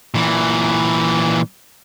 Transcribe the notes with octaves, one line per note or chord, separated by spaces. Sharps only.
A#2 E3